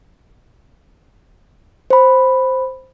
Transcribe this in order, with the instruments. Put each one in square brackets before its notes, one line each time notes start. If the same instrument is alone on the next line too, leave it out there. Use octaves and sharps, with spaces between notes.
[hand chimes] C5 B5